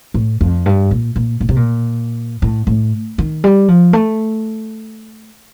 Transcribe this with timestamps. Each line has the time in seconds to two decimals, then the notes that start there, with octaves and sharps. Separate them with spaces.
0.14 A2
0.41 F2
0.66 G2
0.91 A#2
1.16 A#2
1.41 A#2
1.49 C3
1.56 A#2
2.42 A2
2.67 A2
3.18 D#3
3.44 G3
3.68 F3
3.93 A3